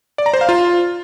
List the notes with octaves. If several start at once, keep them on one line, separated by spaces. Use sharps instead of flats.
D5
A#5
C5
F5
F4